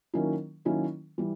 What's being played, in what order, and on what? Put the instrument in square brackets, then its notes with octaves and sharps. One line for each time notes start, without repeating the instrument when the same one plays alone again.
[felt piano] D#3 F#3 A#3 C#4 E4
D#3 F#3 A#3 C#4 E4
E3 G3